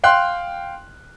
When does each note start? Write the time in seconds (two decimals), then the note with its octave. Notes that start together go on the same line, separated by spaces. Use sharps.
0.04 F5 G5 C6 F#6